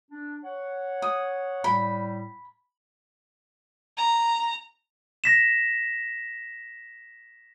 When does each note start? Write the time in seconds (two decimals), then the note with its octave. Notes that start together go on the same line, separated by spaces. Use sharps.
0.11 D4
0.44 C#5 F#5
1.02 D#6
1.64 A2 G3 B5
3.97 A#5
5.24 A#6 B6 E7